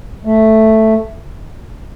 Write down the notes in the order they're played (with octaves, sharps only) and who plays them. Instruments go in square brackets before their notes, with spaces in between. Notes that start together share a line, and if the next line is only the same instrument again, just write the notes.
[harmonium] A3